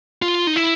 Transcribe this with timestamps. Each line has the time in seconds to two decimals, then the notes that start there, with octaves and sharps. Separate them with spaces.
0.22 F4
0.47 D#4
0.56 E4